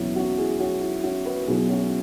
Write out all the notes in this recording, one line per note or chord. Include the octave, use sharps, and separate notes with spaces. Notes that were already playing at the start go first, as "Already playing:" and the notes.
Already playing: F#1 E2 B2 F#3 C#4 E4
C#4 F#4
E4 G#4
C#4 F#4
E4
C#4 F#4
F#4 B4
B1 B2 F#3 E4 G#4
C#4 F#4
C#4